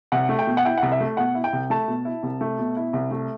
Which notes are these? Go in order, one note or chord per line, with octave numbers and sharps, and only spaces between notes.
C2 F#5
A3
G5
B2
F#5
E4 G5
F#5
C2
E5
A3
B2 F#5
E4
G5
C2
A3 A5
B2
E4
C2
A3
B2
E4
C2
A3